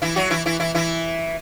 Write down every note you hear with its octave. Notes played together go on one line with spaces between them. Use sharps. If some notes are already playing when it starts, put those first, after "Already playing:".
E3 E4
F#3 F#4
E3 E4
E3 E4
E3 E4
E3 E4